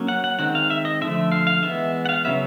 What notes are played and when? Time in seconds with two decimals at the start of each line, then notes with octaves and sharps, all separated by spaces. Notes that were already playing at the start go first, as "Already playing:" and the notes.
Already playing: F#3 A#3 C#4
0.08 F#5
0.24 F#5
0.39 D#3 G#3 C4 F#5
0.55 F5
0.70 E5
0.85 D#5
1.01 D3 F3 A3 E5
1.32 F5
1.47 F5
1.63 E3 G#3 B3 E5
2.06 F#5
2.09 F5
2.25 C#3 F#3 B3 E5